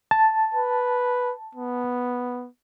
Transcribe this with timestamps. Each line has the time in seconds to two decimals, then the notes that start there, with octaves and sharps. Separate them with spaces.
0.11 A5
0.54 B4
1.55 B3